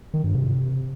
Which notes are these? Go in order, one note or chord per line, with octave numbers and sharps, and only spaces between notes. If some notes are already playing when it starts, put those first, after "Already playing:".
D#3
G2
C3